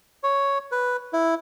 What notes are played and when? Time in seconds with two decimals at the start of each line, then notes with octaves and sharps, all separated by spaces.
0.23 C#5
0.72 B4
1.13 E4